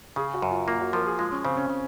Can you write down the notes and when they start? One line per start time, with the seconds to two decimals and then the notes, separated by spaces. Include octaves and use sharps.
0.16 C#3 G#4
0.34 F#4
0.42 F#2
0.51 F4
0.68 A#3 F4
0.80 F#4
0.93 F3 A#4
1.06 G#4
1.19 G#3 F4
1.31 C#4
1.44 C#3 C4
1.57 C#4
1.70 C#3